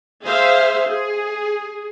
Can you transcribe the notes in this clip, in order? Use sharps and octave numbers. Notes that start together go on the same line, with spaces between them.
G#4 C5 E5 F5
G#4